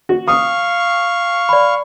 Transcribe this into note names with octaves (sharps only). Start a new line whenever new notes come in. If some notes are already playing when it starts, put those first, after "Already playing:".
F#4
F5 C#6 D#6
D5 B5